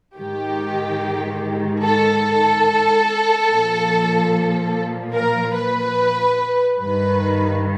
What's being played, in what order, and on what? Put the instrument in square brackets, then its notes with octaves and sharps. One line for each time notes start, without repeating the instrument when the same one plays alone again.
[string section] G#2 D#3 G4
A4
A#2 F3
A#4
B4
G2 D#3 B4